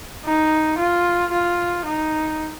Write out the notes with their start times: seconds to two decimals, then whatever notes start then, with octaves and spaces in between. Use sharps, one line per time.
0.25 D#4
0.78 F4
1.31 F4
1.85 D#4